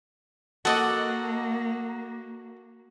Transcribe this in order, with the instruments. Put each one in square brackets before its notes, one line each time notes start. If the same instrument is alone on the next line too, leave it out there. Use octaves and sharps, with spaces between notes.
[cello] A#3 [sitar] F#4 [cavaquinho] A4 D#5 D6